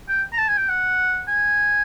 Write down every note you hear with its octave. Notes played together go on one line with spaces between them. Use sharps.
G5
A#5
A5
G#5
G5
F#5
G#5